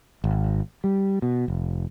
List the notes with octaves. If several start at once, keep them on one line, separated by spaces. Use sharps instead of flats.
G#1
G3
B2
F1